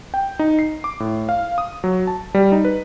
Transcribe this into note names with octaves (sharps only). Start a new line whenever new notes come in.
G5
D#4
C7
D6
A2
F5
D#6
F#3
A5
G3
D#4
B4